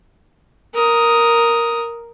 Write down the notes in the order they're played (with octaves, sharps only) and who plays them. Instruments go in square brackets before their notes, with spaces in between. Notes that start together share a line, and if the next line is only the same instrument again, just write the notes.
[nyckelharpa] A#4 D#6